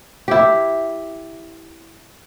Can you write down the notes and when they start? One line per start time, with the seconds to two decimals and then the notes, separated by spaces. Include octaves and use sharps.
0.28 E4 G4